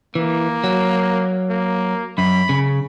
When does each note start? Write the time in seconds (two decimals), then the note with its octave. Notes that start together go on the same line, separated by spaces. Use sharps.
0.15 E3 A#3
0.64 F#3
1.50 A#3
2.18 F#2 B5
2.49 C#3